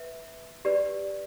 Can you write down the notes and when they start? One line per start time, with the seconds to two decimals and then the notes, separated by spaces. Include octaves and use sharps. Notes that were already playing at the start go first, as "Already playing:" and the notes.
Already playing: B4 E5
0.65 G4 B4 D5